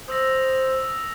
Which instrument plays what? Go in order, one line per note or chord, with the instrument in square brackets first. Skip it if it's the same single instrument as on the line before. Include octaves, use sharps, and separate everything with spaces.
[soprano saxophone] C5 [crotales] D#6 E6 A#6